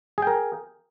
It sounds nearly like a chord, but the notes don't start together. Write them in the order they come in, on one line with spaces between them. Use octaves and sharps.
G#4 G5 A#4